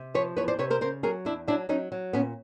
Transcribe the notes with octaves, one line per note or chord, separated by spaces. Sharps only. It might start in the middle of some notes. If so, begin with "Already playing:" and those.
Already playing: C3
F3 B4 C#5
E2 B4 C#5
C5 D5
C3 B4 C#5
A#4 C5
C#3 A#4 C5
F#3 G#4 A#4
E2 D4 E4
F#3 D4 E4
F#3 C#4 D#4
F#3
A#2 B3 C#4